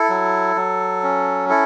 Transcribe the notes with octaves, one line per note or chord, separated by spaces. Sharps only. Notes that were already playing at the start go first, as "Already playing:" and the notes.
Already playing: E4 A4
F#3
F#3
C#4
E4 A4